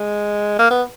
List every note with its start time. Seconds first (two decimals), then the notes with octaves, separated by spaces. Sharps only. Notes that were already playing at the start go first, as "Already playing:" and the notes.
Already playing: G#3
0.59 A#3
0.71 B3